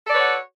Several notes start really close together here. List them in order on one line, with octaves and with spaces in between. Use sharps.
A4 D5 B4 C#5 F#4